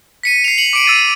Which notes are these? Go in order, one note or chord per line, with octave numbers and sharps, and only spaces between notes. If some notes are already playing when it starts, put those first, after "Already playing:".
B6 C#7 D#7
C7 F7
C#7 F#7
D6 D7 D#7
E6 A6 D#7